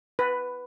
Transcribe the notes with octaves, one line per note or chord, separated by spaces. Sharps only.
B4